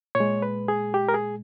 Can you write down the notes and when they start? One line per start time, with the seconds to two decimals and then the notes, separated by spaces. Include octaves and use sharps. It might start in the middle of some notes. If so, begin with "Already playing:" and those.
0.15 A#2 C#5
0.20 G#3
0.42 B4
0.68 G#4
0.94 G4
1.08 A#4
1.14 G#4